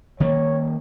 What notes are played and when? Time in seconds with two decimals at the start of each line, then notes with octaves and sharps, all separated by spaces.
0.20 D#3 G3 A#3 C#5